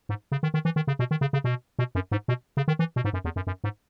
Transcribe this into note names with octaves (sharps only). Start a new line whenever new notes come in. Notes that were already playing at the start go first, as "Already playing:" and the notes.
G#2
C#3
D#3
D#3
E3
D#3
C#3
B2
D#3
C#3
C#3
B2
B2
F#2
G#2
B2
C#3
D#3
E3
B2
G#2
F#2
E2
F#2
F#2
G#2